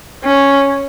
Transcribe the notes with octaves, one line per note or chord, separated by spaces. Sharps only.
C#4